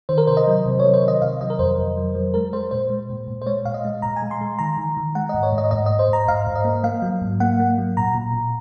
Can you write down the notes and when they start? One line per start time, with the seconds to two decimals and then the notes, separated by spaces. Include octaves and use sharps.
0.09 D#3 C5
0.18 A#4
0.27 C3 C5
0.37 D#5
0.47 F#3
0.66 C3
0.79 C#5
0.84 F#3
0.94 C5
1.03 D#3
1.08 D#5
1.22 C3 F5
1.41 F#3 D#5
1.50 A#4
1.59 F2 C5
1.78 F2
1.97 F#3
2.15 F#3
2.34 G#3 A#4
2.53 G#3 C5
2.71 A#2 C5
2.90 G#3
3.10 A#2
3.28 A#2
3.42 C5
3.46 G#3 C#5
3.65 A#2 F5
3.74 D#5
3.85 G#3
4.02 A#2 A#5
4.16 G#5
4.22 G#3
4.31 C6
4.41 G#3
4.59 D#3 A#5
4.78 D#3
4.97 D#3
5.15 G#3 F#5
5.29 D#5
5.34 G#2
5.43 C#5
5.52 G#2
5.58 D#5
5.71 G#2 D#5
5.86 D#5
5.90 G#2
5.99 C5
6.08 G#2 A#5
6.28 G#2 F5
6.47 G#2
6.55 D#5
6.65 A#3
6.84 A#3 F5
7.02 F#3
7.22 G#2
7.40 A#3 F#5
7.60 A#3
7.78 F#3
7.97 A#2 A#5
8.15 A#2
8.34 A#2